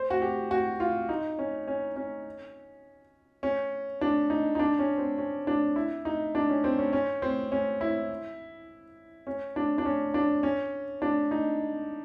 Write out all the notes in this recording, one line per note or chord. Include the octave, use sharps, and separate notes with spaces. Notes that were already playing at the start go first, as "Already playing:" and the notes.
Already playing: C5
F#4
G4
F#4
F4
D#4
C#4
C#4
C#4
C#4
D4
D#4
D#4
D4
C#4
C4
C#4
D4
E4
D#4
D4
C#4
C4
C#4
C#4
C4
C#4
E4
C#4
D4
D4
C#4
D4
C#4
D4
D#4